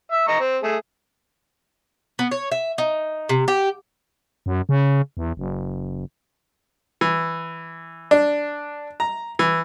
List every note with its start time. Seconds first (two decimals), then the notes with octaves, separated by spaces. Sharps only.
0.12 E5
0.28 D#5 A#5 C#6
0.40 C4
0.63 A3 G#4
2.19 B3
2.31 C#5
2.52 E5
2.78 D#4
3.29 C3
3.48 G4
4.46 F#2
4.69 C#3
5.17 E2
5.37 F#1
7.01 E3
8.11 D4
9.00 A#5
9.39 E3